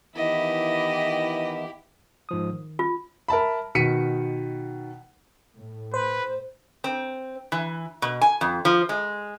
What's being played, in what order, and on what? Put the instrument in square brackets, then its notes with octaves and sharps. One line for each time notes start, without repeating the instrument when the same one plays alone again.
[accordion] D#3 E3 B3 [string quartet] E4 G4 [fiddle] D#5
[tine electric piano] G#2 F3 D#6
D#3
[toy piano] F4
[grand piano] A#4 E5 A5 B5
B2 D#3 B6 C#7 D#7
[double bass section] A2
[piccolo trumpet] B4 [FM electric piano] C5
[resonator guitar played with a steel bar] C4
E3
B2
G#5
F2
F3
G#3